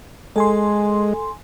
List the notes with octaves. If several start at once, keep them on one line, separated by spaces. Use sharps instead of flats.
G#3 A4 G#5 C6